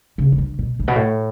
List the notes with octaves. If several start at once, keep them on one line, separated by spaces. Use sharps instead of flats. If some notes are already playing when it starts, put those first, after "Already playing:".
C#3
C#3
D3
B2
A2
B2
A2